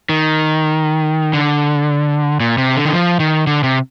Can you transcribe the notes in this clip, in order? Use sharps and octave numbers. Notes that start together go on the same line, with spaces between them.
D#3
D3
A#2
C3
D3
D#3
F3
D#3
D3
C3